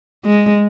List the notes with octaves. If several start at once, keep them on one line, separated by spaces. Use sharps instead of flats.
G#3